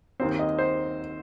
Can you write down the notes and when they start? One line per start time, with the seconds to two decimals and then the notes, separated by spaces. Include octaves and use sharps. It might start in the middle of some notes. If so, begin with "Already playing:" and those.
0.20 D#2 D#3 C4 C5
0.39 D#5
0.59 C5